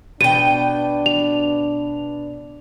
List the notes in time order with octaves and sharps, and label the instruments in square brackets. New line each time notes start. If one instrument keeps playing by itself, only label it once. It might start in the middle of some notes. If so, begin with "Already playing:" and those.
[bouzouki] B2 G5 [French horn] D4 [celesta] D#7
[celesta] F7